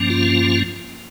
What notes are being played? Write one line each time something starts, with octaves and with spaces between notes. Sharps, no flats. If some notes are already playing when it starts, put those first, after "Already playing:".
Already playing: G2 F3 A#3 C#4
F4